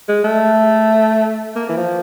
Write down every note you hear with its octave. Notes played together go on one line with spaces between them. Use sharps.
G#3
A3
A#3
E3
F3